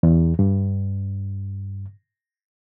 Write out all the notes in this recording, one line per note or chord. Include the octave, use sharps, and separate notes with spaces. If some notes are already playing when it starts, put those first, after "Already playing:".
E2
G2